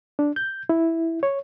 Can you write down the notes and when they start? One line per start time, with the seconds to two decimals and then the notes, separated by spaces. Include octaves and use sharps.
0.19 D4
0.36 G6
0.69 E4
1.23 C#5